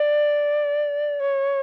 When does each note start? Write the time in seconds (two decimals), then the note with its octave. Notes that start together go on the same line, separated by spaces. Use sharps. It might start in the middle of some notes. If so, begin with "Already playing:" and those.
Already playing: D5
1.20 C#5